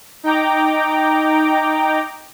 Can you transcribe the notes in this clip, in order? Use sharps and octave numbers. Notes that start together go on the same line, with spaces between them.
D#4 G5 A#5 D6